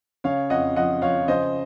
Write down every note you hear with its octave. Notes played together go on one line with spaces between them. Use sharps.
C#3 C#5 F5
F2 D#5 F#5
F3 D#5 F#5
F3 C#5 F5
C#3 C5 D#5